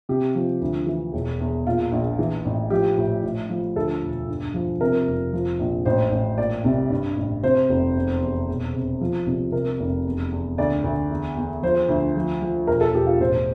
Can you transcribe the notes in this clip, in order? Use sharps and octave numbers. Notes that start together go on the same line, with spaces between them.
C3 G4
F3
D2
E3
E1
E2
A#2 F4
A#1
E3
A1
F3 G4
A2
A2
F3
D2 A4
E1
G2
F3
C3 A#4
F1
F3
A#1
A1 C5
A1
A#2 D5
C2
G2
A1
C3 C5
F1
E2
E2
E1
C3
F3
C2
C3 A#4
F1
E2
E2
D2 D5
D2
E2
E2
F3 C5
D2
F3
F3
E1 A#4
A4
E1 G4
F4
A1 C5